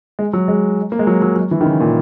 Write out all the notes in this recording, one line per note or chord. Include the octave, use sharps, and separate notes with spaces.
G#3
F#3
G#3
A#3
G#3
F#3
F#3
F#3
E3
D#3
C#3
A#2